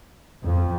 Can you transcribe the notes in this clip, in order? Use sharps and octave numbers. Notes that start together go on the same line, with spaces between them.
F2